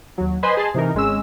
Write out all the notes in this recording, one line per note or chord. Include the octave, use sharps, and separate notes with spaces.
D#2 F#3
B4 C5 D#5 G#5 B5 C6
G#4 D#5 A5 C6
C3 E3 D#4 A#4
G#1 G#3 C#4 E6